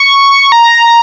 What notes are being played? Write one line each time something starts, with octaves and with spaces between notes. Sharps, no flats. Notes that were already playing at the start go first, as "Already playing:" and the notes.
Already playing: C#6
A#5